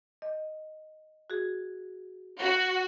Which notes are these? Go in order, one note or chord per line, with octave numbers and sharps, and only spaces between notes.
D#5
F#4 G#4
F#4